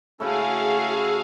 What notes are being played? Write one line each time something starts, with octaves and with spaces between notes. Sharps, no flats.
C#3 A3 C#4 E4 F#4 G#4 A4 F5